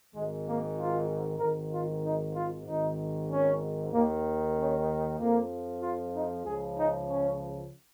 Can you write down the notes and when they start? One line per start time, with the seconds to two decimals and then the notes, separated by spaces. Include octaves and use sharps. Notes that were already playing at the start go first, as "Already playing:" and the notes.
0.13 G#1 G#2 D#3 G#3
0.46 A#3
0.77 F4
1.39 G#1 G#2 D#3 A#4
1.71 F4
2.03 D#4
2.34 F4
2.65 G#1 G#2 D#3 D#4
3.29 C#4
3.92 D#2 D#3 A#3
4.55 C#4
5.18 F2 F3 A#3
5.81 F4
6.13 D#4
6.44 C#2 C#3 F3 G#4
6.75 D#4
7.07 C#4